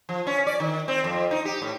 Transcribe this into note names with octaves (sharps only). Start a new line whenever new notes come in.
F3
C#4
D5
D#3
C4
F2
D#4
G4
A2